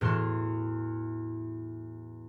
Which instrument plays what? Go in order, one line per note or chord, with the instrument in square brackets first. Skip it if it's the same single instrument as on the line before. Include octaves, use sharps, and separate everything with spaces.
[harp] E2 A2 F#4 C6 E7